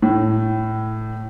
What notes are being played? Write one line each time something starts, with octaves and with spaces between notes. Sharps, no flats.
A2